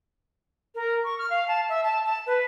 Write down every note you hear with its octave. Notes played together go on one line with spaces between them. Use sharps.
A#4
C#6
F6
F5
A5
E5
A5
A5
B4